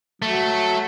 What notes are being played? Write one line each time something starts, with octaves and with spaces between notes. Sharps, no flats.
F#3 A3